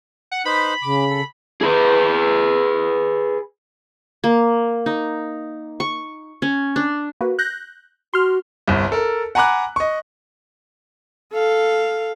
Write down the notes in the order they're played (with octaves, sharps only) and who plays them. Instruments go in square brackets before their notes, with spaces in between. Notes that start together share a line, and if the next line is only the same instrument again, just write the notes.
[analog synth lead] F#5
[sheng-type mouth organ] D#4 B4 C5 [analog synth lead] B5
[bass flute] C#3 [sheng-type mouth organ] D6
[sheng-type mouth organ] A4
[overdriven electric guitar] G#4 B4
[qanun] A#3
D#4
C#6
C#4
D4
[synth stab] A#3 F#4 B4
F#6 G6 A#6
[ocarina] F#4 [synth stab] C6 F6
[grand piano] G1 C2
A4 A#4
F#5 G#5 A#5 B5 D6 F#6
D#5 C#6
[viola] A4 F5